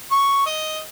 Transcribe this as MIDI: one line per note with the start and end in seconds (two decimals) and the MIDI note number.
0.11 0.42 85
0.46 0.79 75